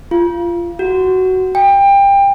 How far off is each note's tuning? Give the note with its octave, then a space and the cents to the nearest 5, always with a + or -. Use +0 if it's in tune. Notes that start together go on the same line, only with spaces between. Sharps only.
F4 -20
F#4 +15
G5 +25